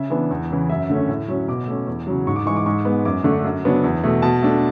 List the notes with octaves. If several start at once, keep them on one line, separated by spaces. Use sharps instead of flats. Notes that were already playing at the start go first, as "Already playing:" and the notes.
Already playing: C#3 E5
E3 B3 D4
E2
C#3 E3
F#2 E5
D3 A3 C#4
A2
F#3 C#4
B2 D6
A3 C#4
E2
C#3 F#3
G#2 C#6
D6
E3 G#3 C#6
D6
G#2 C#6
G#3 B3
F#2 D6
D3 A3 D4 C#6
F#2
C#3 F#3 B3 D4
E2
B2 A3
B2 A5
A3 D4